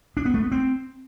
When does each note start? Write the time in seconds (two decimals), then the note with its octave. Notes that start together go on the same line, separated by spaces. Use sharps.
0.17 D4
0.25 B3
0.34 A3
0.43 B3
0.52 C4